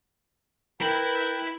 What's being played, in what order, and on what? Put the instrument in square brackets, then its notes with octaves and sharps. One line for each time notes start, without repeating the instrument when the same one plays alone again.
[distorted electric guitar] E4 B5 [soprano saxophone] A#4 [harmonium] B4 G5